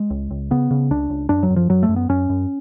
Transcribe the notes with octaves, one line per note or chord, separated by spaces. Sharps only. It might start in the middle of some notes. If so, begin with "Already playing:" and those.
Already playing: G#3
C#2
C#2
C#3 B3
C#3
C#2 D4
C#2
F#2 D4
F#3
F#2
F3
F#2 F#3
A3
F#2
B3
F#2 C#4
F#2